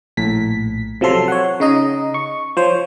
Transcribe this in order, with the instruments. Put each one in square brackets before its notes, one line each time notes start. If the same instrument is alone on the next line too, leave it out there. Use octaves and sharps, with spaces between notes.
[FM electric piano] A#1 A2 B6
C3 F3 F#3 A4 C6
C#5 F#5
C#3 D#4 D#5
C#6
F3 C5 C#5